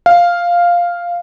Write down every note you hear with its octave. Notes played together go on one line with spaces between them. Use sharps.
F5